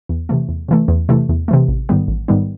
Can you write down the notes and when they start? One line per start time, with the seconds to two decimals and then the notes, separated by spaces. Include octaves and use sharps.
0.09 E2
0.29 C3 E3 A3
0.49 E2
0.68 C3 E3 A3
0.88 E2
1.09 C3 E3 A3
1.29 E2
1.48 C3 E3 A3
1.68 A1
1.89 G#2 D#3 G3 B3
2.08 A1
2.28 G#2 D#3 G3 B3